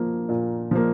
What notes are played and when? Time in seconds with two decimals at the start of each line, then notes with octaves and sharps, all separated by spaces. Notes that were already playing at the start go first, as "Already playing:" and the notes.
Already playing: F3 A#3
0.29 A#2
0.71 F3 A#3